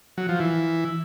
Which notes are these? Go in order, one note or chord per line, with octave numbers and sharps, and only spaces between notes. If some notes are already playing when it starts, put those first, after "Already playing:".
F#3
F3
E3